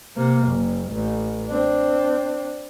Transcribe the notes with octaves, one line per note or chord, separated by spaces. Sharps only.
C3 A#3
F#1
A1
C4 D4